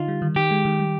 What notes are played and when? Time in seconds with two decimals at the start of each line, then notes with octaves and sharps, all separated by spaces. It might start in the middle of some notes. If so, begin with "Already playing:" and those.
Already playing: D3 D#4 F4
0.08 G3
0.22 D#3
0.36 D#3 G4
0.51 G#3
0.65 D#3
0.79 G3